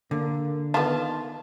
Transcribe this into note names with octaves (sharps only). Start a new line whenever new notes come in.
D3 A#3
D#3 B3 F4 A5